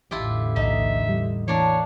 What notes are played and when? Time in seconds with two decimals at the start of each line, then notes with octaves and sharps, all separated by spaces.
0.11 A1 E2 D3 E4 F4 G4
0.56 B1 D#4 D#5 E5
1.09 G3
1.48 E3 A#3 D4 C#5